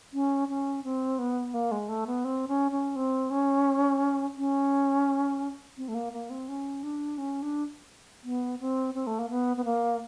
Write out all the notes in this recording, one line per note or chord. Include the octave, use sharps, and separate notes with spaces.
C#4
C#4
C4
B3
A#3
G#3
A3
B3
C4
C#4
C#4
C4
C#4
C#4
C4
A3
A#3
A#3
C4
C#4
D4
C#4
D4
B3
C4
C4
A3
A#3
B3
B3
A#3